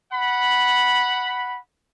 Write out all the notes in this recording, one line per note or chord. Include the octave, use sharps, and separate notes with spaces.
F#5 B5